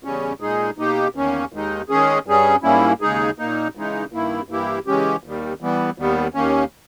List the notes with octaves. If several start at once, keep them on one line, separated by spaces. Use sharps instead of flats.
E2 C#3 G3 C#4
A#2 G#3 D#4 G#4
B2 A#3 D#4 G4
E2 D#3 A#3 C#4
D#2 D#3 G#3 D#4
D#3 G#3 C#4 G#4
G2 G3 C#4 G#4
G#2 G3 A#3 C#4 E4
D#2 C#3 G#3 D#4 G#4
A#2 A#3 D#4
C#3 E3 G#3 D#4
G2 D#3 A#3 E4
G2 E3 A#3 E4 G4
C#3 E3 G#3 C#4 G4
D#2 D#3 G3
E3 G3 B3
D#2 D#3 G3 B3
D#2 D#3 A#3 C#4